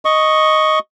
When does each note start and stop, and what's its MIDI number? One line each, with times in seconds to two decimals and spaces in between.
0.05 0.79 75
0.05 0.79 85